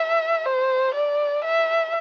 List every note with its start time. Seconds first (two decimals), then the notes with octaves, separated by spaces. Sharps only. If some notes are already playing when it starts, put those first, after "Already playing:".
Already playing: E5
0.46 C5
0.95 D5
1.44 E5